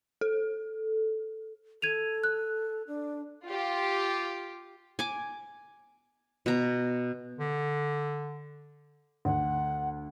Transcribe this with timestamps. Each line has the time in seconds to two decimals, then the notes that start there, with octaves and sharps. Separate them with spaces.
0.21 A4
1.82 A4 G#6 D#7 F7
2.24 F#6
2.87 D4
3.46 F4 G4
4.99 G#5 D6
6.46 B2 A#5
7.38 D3
9.25 D2 F#5